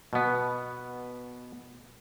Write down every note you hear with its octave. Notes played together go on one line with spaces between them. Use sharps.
B2 B3